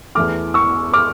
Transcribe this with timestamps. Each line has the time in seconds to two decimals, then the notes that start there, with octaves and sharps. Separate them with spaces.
0.15 E2 E3 A3 D6 F6
0.54 C#6 E6
0.94 D6 F6